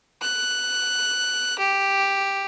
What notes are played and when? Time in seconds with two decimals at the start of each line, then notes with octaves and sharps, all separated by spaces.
0.22 F#6
1.59 G4